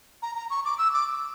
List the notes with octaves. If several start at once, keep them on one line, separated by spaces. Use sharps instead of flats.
A#5
A#5
C#6
D6
E6
D6